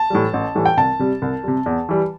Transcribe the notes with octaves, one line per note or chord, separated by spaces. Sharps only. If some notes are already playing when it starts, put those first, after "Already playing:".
Already playing: A5
A2 E3 G3
A1
A2 E3 G3
G5
C2 A5
C3 G3
C2
C3 G3
E2
E3 G3